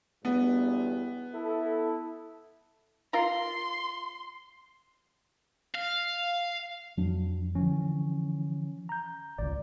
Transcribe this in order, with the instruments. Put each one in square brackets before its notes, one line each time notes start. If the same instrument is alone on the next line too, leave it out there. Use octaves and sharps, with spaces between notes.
[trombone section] B1 E2 G2 [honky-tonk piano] B3
[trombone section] E4 A4
[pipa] F4 A#4 A#5 [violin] C6
[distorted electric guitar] F5
[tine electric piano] F2 [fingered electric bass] F#3 D4
[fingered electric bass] D3 E3 F3 [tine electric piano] C#4
[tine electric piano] A#5 G6
[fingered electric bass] G#1 C#2 [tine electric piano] D5